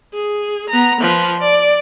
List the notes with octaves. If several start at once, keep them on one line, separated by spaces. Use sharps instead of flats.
G#4
B3 A#5
F3 B4
D5